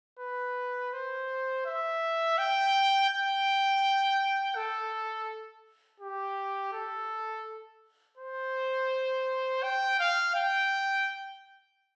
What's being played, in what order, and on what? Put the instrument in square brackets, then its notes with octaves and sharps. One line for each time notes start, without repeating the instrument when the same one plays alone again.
[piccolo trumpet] B4
C5
E5
G5
G5
A4
G4
A4
C5
G5
F5
G5